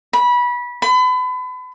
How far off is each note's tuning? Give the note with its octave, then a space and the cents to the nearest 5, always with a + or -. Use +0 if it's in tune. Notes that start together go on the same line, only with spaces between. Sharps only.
B5 -20
B5 +35